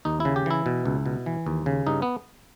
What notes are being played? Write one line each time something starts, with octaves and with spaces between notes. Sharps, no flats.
D#2 D#4
E4
C#3
G4
E3 E4
B2
C#2
B2
E3
D#2
C#3
G2 D#4
B3